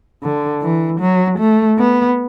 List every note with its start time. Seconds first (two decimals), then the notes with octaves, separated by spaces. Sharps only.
0.23 D3
0.62 E3
1.01 F#3
1.39 A3
1.78 B3